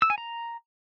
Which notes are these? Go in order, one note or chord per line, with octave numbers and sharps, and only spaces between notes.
E6
G#5
A#5